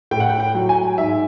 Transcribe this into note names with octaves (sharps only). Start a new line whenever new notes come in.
A2 G5
F#5
G5
G5
F#3
G#5
G#2 E5